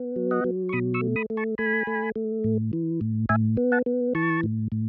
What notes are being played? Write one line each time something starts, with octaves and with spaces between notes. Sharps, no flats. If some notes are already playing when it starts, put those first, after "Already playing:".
Already playing: B3
F#3
D#5 F#5
F#3
C#6
B2 B5 D#6
C#6 E6
A3
B5 D#6
A3
A5 C#6
A3 G#5 B5
A3
A3
A2
E3
A2
A2 E5 G#5
B3
F#5 A5
B3
E3 A5 C#6
A2
A2